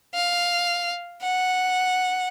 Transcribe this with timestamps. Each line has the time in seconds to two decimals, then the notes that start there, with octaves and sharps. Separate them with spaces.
0.15 F5
1.22 F#5